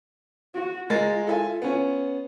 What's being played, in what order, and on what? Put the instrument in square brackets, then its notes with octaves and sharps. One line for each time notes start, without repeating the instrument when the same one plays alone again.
[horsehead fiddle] F#4
[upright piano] G#3 A#4 A6 [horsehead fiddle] F4
[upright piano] A4 E5 G#5
B3 C#4